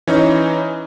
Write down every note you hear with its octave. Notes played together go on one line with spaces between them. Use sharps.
E3 C#4 D#4